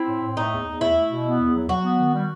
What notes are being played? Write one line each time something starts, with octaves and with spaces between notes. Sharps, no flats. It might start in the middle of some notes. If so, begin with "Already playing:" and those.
Already playing: C4 E4
A2
A2
A3 D#4
E2
E2
A3 E4
A3
B2
B3
E2
F#3
F#3 F#4
B3
D#3
G3